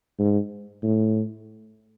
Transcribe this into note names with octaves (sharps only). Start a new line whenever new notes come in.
G#2
A2